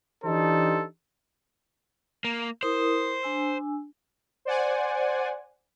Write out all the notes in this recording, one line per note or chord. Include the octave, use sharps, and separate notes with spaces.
E3 D4 D#4 G4 A4 C5
A#3
E4 A#4 C5 D#6
D4 G#5 E6
C5 D5 F#5 G#5